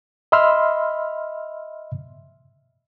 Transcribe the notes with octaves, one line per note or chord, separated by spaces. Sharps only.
D#5 E5 B5 C6 E6 F6